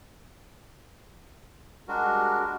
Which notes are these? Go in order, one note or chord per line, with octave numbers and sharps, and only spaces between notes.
G3 G#3 D4 F#4 A#4